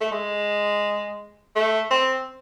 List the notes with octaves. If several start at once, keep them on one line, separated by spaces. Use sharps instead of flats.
A3
G#3
A3
C4